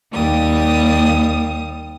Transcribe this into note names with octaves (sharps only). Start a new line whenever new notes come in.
D#2 G3 D#6